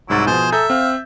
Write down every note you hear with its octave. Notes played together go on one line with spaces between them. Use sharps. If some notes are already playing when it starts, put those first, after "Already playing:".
C2 G#2 F#3 E4 A6
B2 F3 G#4 C5
A4 E5 A#5 G6
C4 F5